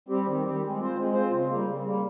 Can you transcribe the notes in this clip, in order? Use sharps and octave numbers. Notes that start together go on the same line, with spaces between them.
G3 C4 G4
D#3
G3 C4 G4
G#3
C4 F4 C5
G#3
C4 F4 C5
C#3
G3 A#3
C#3
G3 A#3